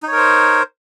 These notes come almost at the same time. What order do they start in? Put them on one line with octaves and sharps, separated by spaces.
D#4 C#5 A#4 C5